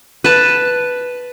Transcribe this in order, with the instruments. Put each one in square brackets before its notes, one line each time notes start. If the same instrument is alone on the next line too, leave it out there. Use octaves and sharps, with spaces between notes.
[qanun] B4 A5